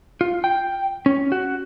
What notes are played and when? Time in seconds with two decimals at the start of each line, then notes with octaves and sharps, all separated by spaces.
0.21 F4
0.44 G5
1.06 C#4
1.32 F#4